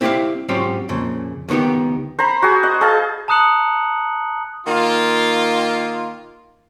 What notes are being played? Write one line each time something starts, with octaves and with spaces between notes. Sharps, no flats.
C4 E4 G4 C5 D5 F5
G#2 F#3 C4 C#4 F4 G4
F2 A#2 C#3
C#2 D#3 B3 D#4 G4
C5 A#5 B5
F#4 G#4
D#5 F#5
G#4 D#5 F5 A5
A5 A#5 D#6 F#6 C#7 F#7
D#3 A#3 F4